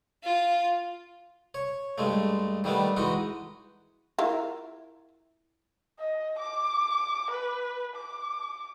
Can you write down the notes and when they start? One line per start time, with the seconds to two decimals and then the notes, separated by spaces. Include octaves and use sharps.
0.23 F4
1.54 C#5
1.98 G2 G#3 A3
2.64 D#3 G3 A3 B3 D4
2.97 E3 G#3 D#4 F#4
4.19 E4 F4 A#4
5.99 D#5
6.39 D6
7.31 B4
7.96 D6